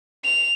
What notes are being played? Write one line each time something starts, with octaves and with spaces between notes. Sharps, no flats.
F7